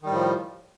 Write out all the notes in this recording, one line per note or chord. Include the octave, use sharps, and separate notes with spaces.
A2 D#3 F3 G3